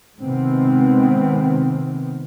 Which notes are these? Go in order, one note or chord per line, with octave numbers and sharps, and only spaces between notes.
C3 D#3 G#3 B3 C4